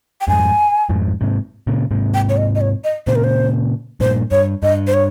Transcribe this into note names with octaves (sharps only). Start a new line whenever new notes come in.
G5
F2 G#2 G#5
F2 G#2
G#2 C3
A#2 C#3
G#2 C3
G5
C#5
D#5
D#5
C#5
D#5
A#2 C#3 C5
A#4
C5
G2 A#2 C5
G2 C#5
G2 D#5
C5
C#5